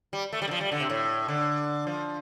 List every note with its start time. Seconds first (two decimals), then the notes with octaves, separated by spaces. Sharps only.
0.13 G3
0.33 A3
0.42 G3
0.48 D3
0.51 F3
0.61 G3
0.72 D3
0.80 C3
0.90 A2
1.28 D3
1.87 F3